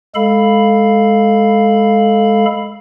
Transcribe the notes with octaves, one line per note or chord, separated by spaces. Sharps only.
G#3 A4 F5 B5